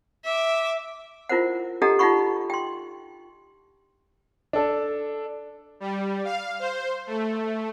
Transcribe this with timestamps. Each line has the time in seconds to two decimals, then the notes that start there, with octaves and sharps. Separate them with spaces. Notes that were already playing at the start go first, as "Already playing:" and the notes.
0.25 E5 D6
1.29 E4 F4 A#4 C5 F#5
1.82 D4 G4 A4 D#5 F#5 A#5
1.99 D#4 F4 G4 F#5 B5 C#6
2.50 G5 C6
4.53 D4 A4
5.80 G3
6.25 F5
6.59 C5
7.07 A3